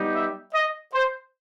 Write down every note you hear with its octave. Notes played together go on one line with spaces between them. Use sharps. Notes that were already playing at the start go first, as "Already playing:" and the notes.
Already playing: G3 B3 D#4 G4
E5
D#5
C5